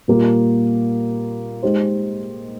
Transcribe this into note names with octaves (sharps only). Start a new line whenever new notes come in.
A#2 G3 A#3 F4
G#3 D#4 G4 C5